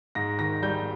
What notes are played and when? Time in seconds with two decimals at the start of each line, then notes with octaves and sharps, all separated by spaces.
0.15 G#2 A#6
0.39 D#3 A#6
0.62 G3 G6